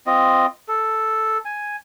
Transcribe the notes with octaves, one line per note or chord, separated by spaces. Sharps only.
C4 F4 D#5
A4
G#5